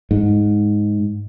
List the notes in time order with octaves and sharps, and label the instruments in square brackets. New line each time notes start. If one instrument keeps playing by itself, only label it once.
[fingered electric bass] G#2